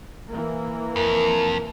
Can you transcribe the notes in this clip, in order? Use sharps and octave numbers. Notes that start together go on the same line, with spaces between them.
E3 A#3
F2 A#4